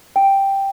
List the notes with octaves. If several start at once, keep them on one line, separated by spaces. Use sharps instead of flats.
G5